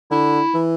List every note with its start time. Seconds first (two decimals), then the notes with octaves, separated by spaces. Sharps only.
0.11 D3 E4
0.54 E3